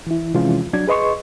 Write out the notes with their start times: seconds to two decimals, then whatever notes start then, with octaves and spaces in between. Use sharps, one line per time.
0.07 E3 E4
0.34 C3 E3 F3 G#3 C#4 F4
0.73 F#3 D4 G#6
0.87 G#4 B4 D#5 C6 C#6